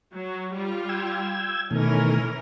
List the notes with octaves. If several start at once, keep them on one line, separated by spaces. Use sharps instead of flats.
F#3
G3 F4
G5 E6 G#6
B2 D#3 E3 A3 C#4 A#4